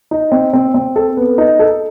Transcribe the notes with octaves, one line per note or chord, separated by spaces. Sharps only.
D#4
C4
C4
C4
A4
B3
D#4
A4